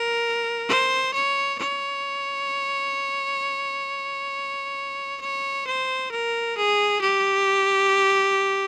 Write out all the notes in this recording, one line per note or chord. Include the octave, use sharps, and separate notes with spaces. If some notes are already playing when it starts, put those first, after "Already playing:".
Already playing: A#4
C5
C#5
C#5
C#5
C5
A#4
G#4
G4